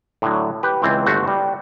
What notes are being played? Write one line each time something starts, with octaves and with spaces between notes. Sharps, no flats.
A2 D3 F#3
G4 B4
C#2 E3 C4
G1 A3 F#4 C5
G3